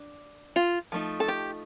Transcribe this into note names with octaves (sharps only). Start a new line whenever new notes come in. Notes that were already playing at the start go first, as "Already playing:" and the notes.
Already playing: D4
F4
F3 A3 D#4
A4
G4